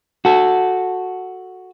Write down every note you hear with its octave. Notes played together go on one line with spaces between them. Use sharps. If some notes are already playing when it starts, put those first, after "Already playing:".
F#4 A4